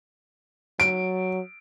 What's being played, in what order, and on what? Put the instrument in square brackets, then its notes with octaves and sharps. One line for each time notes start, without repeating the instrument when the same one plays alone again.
[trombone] F#3 [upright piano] D7